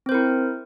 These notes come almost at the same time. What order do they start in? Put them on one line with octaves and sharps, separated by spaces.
C4 C5 A#4 E4